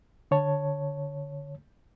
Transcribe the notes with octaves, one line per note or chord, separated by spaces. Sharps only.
D3 C#5 A5